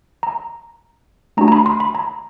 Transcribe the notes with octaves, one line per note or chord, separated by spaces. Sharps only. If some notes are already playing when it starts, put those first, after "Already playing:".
A#5
A3 D4 F#4 A#5
A#5
B5
C6
B5
A#5